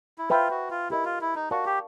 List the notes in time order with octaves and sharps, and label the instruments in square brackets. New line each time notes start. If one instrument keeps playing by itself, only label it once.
[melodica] E4
[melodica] F4 [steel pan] B4 E5 G5 B5
[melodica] F#4
F4
[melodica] E4 [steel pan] G4 A#4 D#5
[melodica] F4
E4
D#4
[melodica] F#4 [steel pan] A#4 D5 F5 A5 C#6
[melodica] G4